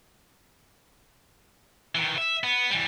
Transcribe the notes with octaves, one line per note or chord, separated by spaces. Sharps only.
D#3 E3
E5
B3
E3 G3